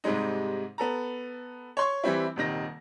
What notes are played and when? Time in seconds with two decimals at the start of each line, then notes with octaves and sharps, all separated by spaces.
0.04 G#2 C3 G3 G#3 D#4
0.78 B3 A4 A#5
1.77 C#5 C6 C#6
2.04 E3 G3 C4 E4
2.36 D#1 C3 D#3 A#6